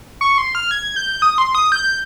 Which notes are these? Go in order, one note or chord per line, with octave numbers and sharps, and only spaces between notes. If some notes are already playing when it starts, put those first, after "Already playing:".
C#6
C6
F6
G#6
G6
D#6
C6
D#6
G6